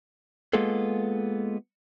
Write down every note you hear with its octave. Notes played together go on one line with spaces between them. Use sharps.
G#3 A#3 B3 F4 G#4 A4